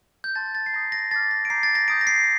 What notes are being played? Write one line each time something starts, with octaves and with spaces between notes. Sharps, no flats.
G6
A5 C6 G6 A6
A6
C7
A#5 D#6 G6 A#6
A#6
A5 D6 F6 A6
A#6
D7
A#5 D6 G6 C7
A6
A#6
A#5 D#6 G6 D7
A#6
C7